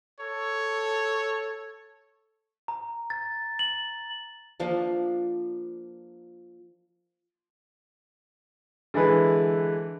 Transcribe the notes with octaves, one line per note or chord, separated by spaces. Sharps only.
A4 C#5
A#5
A6
F#7
F3 A#3 D4
D3 E3 G#3 B4